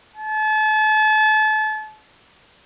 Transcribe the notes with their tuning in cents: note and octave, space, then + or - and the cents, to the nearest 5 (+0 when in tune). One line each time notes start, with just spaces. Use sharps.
A5 -35